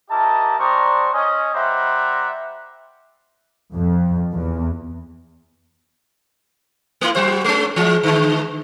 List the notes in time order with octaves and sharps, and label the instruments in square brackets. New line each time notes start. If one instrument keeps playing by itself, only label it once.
[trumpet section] E4 G4 A#4 D#5 A5
G3 D4 C5 A#5 C#6 D#6
C#4 D#5
G3 C5 E5 F#5 A#5 D6
[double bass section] F2
E2
[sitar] A3 E4
F#3 F#4 C5
G#3 C#4
E3 G#3
D3 G#3